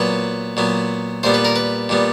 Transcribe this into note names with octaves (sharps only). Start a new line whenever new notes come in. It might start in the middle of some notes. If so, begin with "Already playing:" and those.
Already playing: A#2 F#3 B3 B4
A#2 F#3 B3
A#2 G3 B3 C5
B4
A#4
B4
A#2 G3 B3